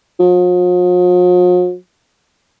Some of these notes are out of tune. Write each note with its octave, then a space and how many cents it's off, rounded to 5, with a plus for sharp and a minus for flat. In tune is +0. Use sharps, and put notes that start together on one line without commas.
F3 +45